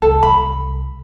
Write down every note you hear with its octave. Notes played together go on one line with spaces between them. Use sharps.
C#2 A4
C2 B5